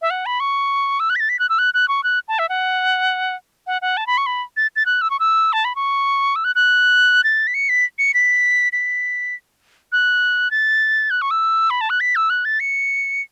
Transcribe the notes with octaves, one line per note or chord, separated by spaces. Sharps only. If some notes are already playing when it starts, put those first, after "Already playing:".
E5
F#5
B5
C#6
E6
F#6
B6
A6
B6
F#6
E6
F#6
F#6
C#6
F#6
A5
E5
F#5
F#5
F#5
A5
B5
C#6
B5
A6
A6
F#6
E6
C#6
E6
A5
B5
C#6
E6
F#6
F#6
A6
B6
C#7
B6
C#7
B6
B6
F#6
A6
F#6
C#6
E6
B5
A5
F#6
B6
E6
F#6
A6
C#7